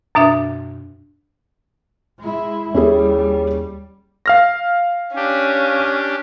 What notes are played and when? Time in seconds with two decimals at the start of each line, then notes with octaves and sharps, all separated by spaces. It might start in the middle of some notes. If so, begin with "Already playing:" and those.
0.15 F#2 B2 D4 E5 A6
2.20 G#3 E4
2.74 D#2 G3 C#4 E4 G#4
4.26 F5 F6 A#6
5.16 C#4 D4 G4